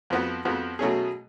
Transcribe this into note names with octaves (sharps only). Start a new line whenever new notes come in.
F2 F3 B3 F#4
F2 F3 B3 F#4
B2 F#3 A3 C#4 G#4